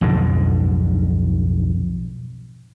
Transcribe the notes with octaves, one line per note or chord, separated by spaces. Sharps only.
B1 F2 G#2 D3